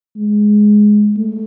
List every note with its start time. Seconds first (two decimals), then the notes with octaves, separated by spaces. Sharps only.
0.16 G#3
1.16 A3